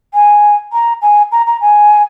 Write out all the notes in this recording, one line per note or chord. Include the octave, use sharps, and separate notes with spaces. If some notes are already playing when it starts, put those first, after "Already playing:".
G#5
A#5
G#5
A#5
A#5
G#5